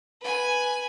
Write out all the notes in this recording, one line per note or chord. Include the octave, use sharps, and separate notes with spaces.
B4 G#5